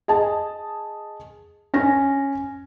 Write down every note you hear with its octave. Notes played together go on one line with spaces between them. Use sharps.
G#4 D#5 A5
C#4 A#6